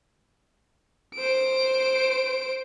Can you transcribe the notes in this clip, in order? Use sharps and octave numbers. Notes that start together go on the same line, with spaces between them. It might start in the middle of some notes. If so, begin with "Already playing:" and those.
C5 D7